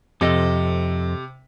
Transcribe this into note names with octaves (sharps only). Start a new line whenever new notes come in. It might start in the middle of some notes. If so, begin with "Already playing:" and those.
F2 C3 A4 D#5